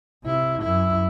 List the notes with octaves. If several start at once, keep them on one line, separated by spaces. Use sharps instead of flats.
C3 E4
F#2 E4